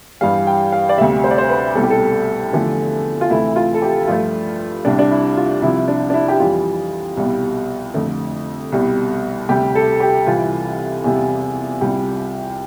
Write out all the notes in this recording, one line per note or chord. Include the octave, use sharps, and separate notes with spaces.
G2 E3 G3 F5
G5
F5
D5
D2 C3 G3 E5
C5
D5
C5
B4
C2 B2 G3 A4
G4
A4
E2 D3 F3 A3
F4
D2 C3 E3 A3 E4
F4
A4
G4
G2 F3 A3 F4
C2 C3 G3 D4
D4
E4
F4
C2 C3 F3 E4
D4
D4
E4
G4
F2 E3 G3 F4
C2 B2 G3
F2 D3 A3
C2 B2 G3
D2 C3 G3 G4
A4
G4
C2 C3 E3 F4
E2 C3 G3
C2 C3 G3 G4